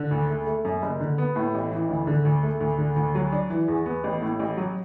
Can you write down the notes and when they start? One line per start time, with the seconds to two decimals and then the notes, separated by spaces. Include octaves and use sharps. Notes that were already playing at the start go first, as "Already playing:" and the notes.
Already playing: D3
0.11 D2
0.30 A3
0.47 A3
0.65 F#2
0.82 F#1
1.01 D3
1.18 B3
1.36 A2
1.54 A1
1.72 E3
1.89 D2
2.07 D3
2.25 D2
2.43 A3
2.60 D2
2.78 D3
2.96 D2
3.15 F#3
3.32 D4
3.50 E3
3.68 E2
3.86 B3
4.04 A1
4.22 A2
4.39 A1
4.57 F#3